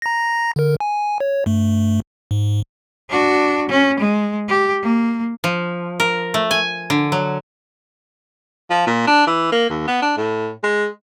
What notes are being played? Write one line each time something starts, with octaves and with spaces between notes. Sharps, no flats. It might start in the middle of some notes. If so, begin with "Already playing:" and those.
A#5 A#6
D3 A#4
G#5
C#5
G2 A3
G#2
D4 F#4
C#4
G#3
G4
A#3
F3
A#4
A3
G#5
D3
F#3
F3
A#2
D4
E3
A#3
D#2
B3
D4
A2
G#3